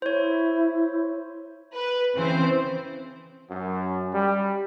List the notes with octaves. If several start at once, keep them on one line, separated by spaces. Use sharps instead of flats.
E4 C5 C#5
B4
C#3 E3 C4 C5
F#2
G3